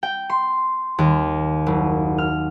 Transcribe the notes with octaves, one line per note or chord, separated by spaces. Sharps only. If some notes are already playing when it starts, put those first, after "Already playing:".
G5
C6
D#2
F#1
F6